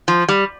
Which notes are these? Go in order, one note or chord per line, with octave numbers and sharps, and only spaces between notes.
F3
G3